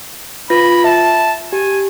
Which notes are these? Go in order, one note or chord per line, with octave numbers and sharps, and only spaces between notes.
F4 B4 B5 A#6
E5 A5
G4 G#5